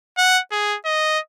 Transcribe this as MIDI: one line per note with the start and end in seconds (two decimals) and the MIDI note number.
0.18 0.40 78
0.52 0.77 68
0.85 1.19 75